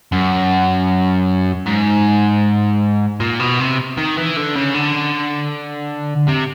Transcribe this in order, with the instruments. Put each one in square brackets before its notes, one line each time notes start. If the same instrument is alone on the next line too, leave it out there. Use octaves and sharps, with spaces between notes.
[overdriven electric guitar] F#2
G#2
A#2
B2
C3
D#3
E3
D3
C#3
D3
C3